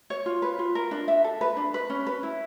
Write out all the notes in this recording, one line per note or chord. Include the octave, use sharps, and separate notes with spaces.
C#5
F4
B4
F4
A#4
D4
E5
A4
B4
D4
B4
C#4
B4
E4